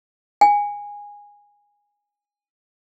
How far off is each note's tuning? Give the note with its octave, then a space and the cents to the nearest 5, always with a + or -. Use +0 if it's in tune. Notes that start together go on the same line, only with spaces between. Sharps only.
G#5 -15